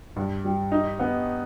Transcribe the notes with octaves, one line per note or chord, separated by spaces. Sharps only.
G2
G3
D#4
B3